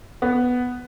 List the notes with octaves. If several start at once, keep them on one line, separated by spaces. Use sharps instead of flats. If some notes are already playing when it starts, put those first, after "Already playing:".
B3